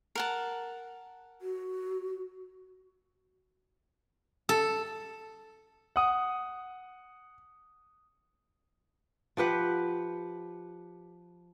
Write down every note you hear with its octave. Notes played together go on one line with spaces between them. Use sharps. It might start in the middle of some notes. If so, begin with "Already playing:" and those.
A#4 F#5 A5
F#4
A4
F#5 D#6
F3 G4 B4 F#5